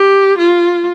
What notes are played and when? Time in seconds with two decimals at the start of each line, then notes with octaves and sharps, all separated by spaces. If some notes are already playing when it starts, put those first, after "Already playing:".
Already playing: G4
0.38 F4